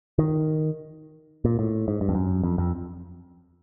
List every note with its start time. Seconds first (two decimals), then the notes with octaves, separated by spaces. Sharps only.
0.18 D#3
1.45 A#2
1.59 A2
1.88 G#2
2.01 G2
2.09 F2
2.15 F#2
2.43 F2
2.58 F2